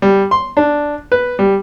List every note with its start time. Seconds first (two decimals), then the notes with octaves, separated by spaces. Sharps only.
0.02 G3
0.31 C6
0.57 D4
1.12 B4
1.39 G3